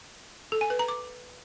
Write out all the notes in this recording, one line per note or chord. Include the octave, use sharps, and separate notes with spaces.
A4
G#5
B4
A#5
D6